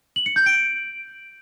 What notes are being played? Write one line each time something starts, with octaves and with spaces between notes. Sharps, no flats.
F#7
C#7
G6
D7